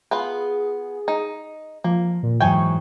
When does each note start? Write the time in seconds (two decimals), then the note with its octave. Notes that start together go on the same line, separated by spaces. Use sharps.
0.11 B3 F4 G#4 B4
1.08 D#4
1.84 F3 A#3
2.23 A#2
2.40 G#2 E3 F#3 G5 G#5 C#6